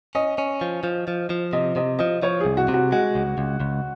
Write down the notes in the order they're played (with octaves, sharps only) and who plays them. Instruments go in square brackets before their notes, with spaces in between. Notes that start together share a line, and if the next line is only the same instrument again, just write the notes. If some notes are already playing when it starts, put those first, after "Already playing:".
[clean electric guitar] C#4 [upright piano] D#5
[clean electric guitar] C#4
F3
F3
F3
F3
[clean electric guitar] C3 [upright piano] D#5
[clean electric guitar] C3 [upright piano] D#5
[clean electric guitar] F3 [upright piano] D#5
[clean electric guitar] F3 [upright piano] C#5
[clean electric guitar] C2 [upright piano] G#4
[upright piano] F#4
[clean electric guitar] C3
[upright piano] F#4
[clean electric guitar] G#3 [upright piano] F#4
[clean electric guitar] C#2
C#2
C#2